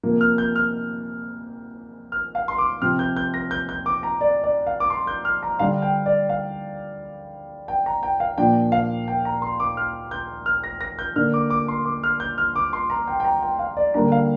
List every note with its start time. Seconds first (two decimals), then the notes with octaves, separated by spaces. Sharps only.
0.03 C3 F3 A#3
0.21 F6
0.38 G6
0.56 F6
2.12 F6
2.35 F5
2.48 C6
2.58 D6
2.81 C3 F3 C4 F6
2.99 G6
3.17 G6
3.34 A#6
3.51 G6
3.69 G6
3.86 D6
4.03 A#5
4.21 D5
4.44 D5
4.67 F5
4.80 D6
4.90 C6
5.07 G6
5.25 F6
5.43 A#5
5.59 D3 G3 D4 F5
5.82 G5
6.06 D5
6.29 F5
7.68 G5
7.86 A#5
8.03 G5
8.20 F5
8.38 A#2 F3 D4 G5
8.72 F5
9.08 G5
9.25 A#5
9.42 C6
9.60 D6
9.77 F6
10.11 G6
10.46 F6
10.64 A#6
10.81 A#6
10.99 G6
11.16 D3 A#3 D4 F6
11.34 D6
11.50 D6
11.68 C6
11.85 D6
12.03 F6
12.20 G6
12.38 F6
12.56 D6
12.73 C6
12.90 A#5
13.08 G5
13.20 G5
13.25 A#5
13.43 G5
13.59 F5
13.77 D5
13.94 D3 G3 A#3 D4 A#5
14.12 F5